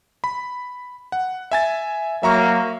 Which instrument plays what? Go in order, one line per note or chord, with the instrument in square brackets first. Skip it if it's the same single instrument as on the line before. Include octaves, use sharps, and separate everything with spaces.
[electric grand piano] B5
F#5
E5 G#5 A6
[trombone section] F#3 A#3 [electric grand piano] E5 A#5 C#6